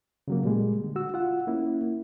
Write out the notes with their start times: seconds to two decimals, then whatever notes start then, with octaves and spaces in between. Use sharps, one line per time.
0.28 C#3 F#3 A#3
0.44 A#2 G3 G#3
0.84 D3
0.96 F#4 E6
1.14 F4 F#5
1.47 A#3 C#4 E4